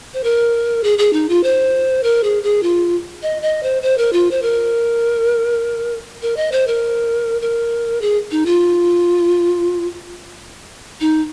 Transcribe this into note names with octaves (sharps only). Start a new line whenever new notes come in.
C5
A#4
G#4
G#4
D#4
F4
C5
A#4
G#4
G#4
F4
D#5
D#5
C5
C5
A#4
F4
C5
A#4
A#4
D#5
C5
A#4
A#4
G#4
D#4
F4
D#4